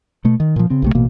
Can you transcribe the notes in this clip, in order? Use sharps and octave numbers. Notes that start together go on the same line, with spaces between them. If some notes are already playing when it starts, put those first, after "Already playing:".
B2 A3
D#3
A#2 F3
C#3 C4
B1 C3 A3
A1 B2 A#3